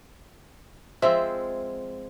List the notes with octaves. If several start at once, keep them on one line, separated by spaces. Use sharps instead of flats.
F3 G#3 C4 E5